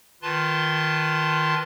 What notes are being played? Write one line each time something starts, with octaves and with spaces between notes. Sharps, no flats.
D#3 F4 B4 A5 C6